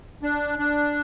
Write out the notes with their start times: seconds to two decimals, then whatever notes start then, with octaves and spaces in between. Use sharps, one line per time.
0.23 D4
0.59 D4